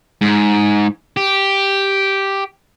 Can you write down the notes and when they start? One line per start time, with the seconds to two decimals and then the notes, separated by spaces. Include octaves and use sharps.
0.21 G#2
1.17 G4